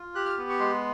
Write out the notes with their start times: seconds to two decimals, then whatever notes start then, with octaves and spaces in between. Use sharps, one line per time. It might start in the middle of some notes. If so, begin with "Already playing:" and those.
Already playing: F4
0.15 G4 F#6
0.25 F6
0.38 B3
0.49 C#6
0.60 G#3 C6